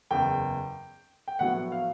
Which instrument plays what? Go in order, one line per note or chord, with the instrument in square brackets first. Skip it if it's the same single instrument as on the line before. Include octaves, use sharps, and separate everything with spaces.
[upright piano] F#1 E2 C#3 G5
G5
A#1 A2 F#3 B3 F#5
F5